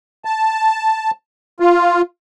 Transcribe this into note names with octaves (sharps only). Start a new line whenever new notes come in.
A5
F4